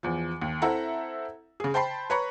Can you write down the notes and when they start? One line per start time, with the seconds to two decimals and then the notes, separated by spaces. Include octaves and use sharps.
0.03 E2 F3
0.42 D#2
0.62 C4 E4 A4 E5 F#5 A#5
1.60 C#3 G#4
1.74 C5 G5 A5 B5 C7
2.10 B4 C#5 A#5 B5 C#6